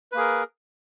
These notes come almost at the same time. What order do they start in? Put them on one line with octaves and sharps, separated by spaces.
B4 A#3 G#4 A#4